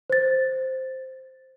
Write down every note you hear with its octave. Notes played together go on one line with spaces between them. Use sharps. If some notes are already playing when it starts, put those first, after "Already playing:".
C5 A6